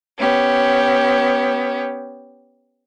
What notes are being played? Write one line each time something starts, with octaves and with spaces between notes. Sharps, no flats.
B3 C#4 G4